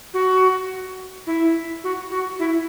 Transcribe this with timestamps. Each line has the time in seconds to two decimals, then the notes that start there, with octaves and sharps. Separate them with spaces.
0.14 F#4
1.27 E4
1.84 F#4
2.11 F#4
2.39 E4